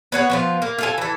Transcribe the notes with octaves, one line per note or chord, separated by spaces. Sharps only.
B3 C#5 F#5
F3 B3 F4
A#3
F4 A4 G#5
E3 A4